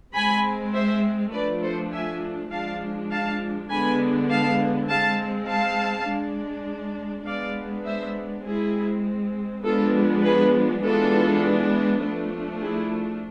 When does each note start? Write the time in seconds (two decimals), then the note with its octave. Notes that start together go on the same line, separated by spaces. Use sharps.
0.14 G#3 C4 G#5 B5
0.73 C5 E5
1.32 F3 A3 D4 B4 D5
1.62 A4 C5
1.92 E5 G#5
2.51 F3 G#3 D4 F5 A5
3.11 F5 A5
3.70 D3 G#3 B3 D4 G#5 B5
4.30 F5 A5
4.89 G#3 C4 F5 A5
5.48 F5 A5
6.08 G#3 D4
7.26 G#3 B3 D4 D5 F5
7.86 C5 E5
8.45 G#3 C4 E4 G#4
9.64 F3 G#3 B3 D4 F4 A4
10.23 G#4 B4
10.83 E3 G#3 B3 D4 F4 A4
12.02 F3 A3 D4
12.61 E4 G#4